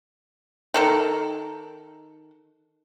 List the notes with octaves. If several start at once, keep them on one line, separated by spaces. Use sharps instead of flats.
D#3 A4 A#4